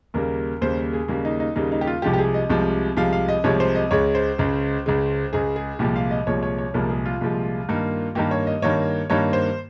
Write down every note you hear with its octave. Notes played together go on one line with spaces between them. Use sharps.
D#2 C#3 G3 A#3 A#4
D#2 C#3 G3 A#3 C5
G#4
D#2 C#3 G3 A#3
D#4
D#4
D#2 C#3 G3 A#3 D#4
D#4
G4
F4
C2 C3 F3 G#3 G4
G4
G#4
D#5
C2 C3 F3 G#3
C2 C3 F3 G#3 F5
F5
D#5
C2 C3 F3 G#3 C#5
C5
D#5
C#2 C#3 G#3 C#5
C5
C#2 C#3 G#3
C#2 C#3 G#3
C#2 C#3 G#3 G#4
G#4
C2 A#2 F3 G#3 G4
F5
D#5
C2 A#2 F3 G#3 C#5
C#5
C#5
C2 A#2 F3 G#3 A#4
G#4
F4
C2 A#2 F3 G#3
G2 D#3 A#3
G2 D#3 A#3 G4
C#5
D#5
G2 D#3 A#3 C#5
G2 D#3 A#3 C#5
C5